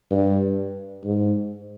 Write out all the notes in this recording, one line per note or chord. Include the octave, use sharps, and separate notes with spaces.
G2
G#2